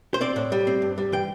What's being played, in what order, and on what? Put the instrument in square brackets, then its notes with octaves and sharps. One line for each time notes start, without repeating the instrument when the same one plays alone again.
[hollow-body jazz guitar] C5
C4 D5
A2
G3
C4
G2
G3
E3 G5